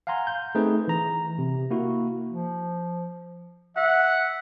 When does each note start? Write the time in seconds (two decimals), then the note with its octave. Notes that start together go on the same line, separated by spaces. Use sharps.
0.07 F5 F#5 G#5 A#5 C6
0.27 G6
0.55 A3 C4 D#4 G#4 B4
0.88 E3 A#5
1.38 C3
1.71 A#3 E4 F#4
2.28 F3
3.76 E5 F#5